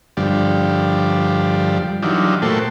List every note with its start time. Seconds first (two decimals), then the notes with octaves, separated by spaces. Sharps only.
0.17 G2 D3 F3 G3
2.03 E3 F#3 D4 D#4 F4 G4
2.42 A#2 A3 F#4 A4 C5 G5